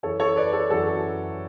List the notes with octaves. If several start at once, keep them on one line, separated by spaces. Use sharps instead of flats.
F#2 E3 A4 C#5
A4 C#5
B4 D5
A4 C#5
F#2 E3 F#4 A4